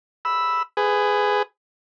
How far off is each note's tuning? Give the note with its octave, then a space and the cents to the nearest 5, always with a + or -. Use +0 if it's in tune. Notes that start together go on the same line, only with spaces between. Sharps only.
B5 +0 E6 +0
G#4 +0 B4 +25